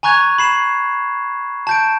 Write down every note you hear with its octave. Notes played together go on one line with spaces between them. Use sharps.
G#5 A#5 C#6 F#6 G#6 F7
B5 C7 E7
A5 G6 D7